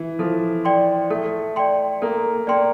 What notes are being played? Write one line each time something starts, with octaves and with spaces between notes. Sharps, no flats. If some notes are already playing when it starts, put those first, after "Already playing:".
Already playing: E3
F3 A4
D5 G5 C6
A3 A4
D5 G5 C6
A#3 A4
A#3 D5 G5 C6